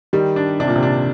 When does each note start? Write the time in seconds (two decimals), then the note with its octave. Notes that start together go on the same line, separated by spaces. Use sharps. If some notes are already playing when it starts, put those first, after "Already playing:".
0.13 D#3 G3
0.36 D4
0.60 C3 D4
0.68 A#2
0.76 C3
0.83 D4